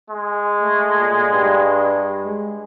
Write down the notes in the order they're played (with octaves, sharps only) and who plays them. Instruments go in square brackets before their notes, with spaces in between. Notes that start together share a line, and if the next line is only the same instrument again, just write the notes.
[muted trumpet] G#3
[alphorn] A3
A#2
G2
G#3